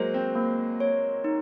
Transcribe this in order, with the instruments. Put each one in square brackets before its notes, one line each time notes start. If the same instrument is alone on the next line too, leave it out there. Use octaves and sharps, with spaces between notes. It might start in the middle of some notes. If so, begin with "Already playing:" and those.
Already playing: [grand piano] F#3 G#3 A#3 [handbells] C5
[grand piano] C4
[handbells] A#3
C#5
D#4